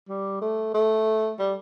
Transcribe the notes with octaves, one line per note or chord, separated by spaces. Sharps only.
G3
A3
A3
G3